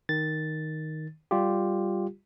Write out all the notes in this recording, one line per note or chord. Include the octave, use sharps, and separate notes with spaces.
D#3 A6
G3 F4 G4